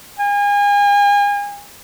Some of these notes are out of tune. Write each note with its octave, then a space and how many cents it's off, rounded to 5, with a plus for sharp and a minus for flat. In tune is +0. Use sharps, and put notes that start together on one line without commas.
G#5 -35